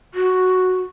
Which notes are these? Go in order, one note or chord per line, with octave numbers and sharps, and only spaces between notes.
F#4